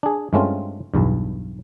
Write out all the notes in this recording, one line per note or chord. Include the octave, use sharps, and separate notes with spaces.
D4 G#4
G2 G#3 A3 C4 C#4 F4
B1 E2 G2